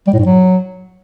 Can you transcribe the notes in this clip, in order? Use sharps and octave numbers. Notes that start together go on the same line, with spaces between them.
G3
A2
G#2
F#3